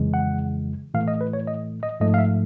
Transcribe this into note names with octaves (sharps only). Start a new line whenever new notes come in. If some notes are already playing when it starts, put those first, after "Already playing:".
Already playing: F2 C#3 E3 G#3
F#5
A2 E3 A3 F5
D#5
B4
C#5
D#5
D#5
G#2 F3 A3 D#5
F5
E5